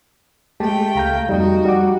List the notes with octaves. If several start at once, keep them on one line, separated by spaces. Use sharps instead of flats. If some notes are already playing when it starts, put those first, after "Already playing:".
G#3 A3 G4 G5 A5
C#2 F5 A#5 G6
F2 G3 D#4 F#4
G3 F#5 D6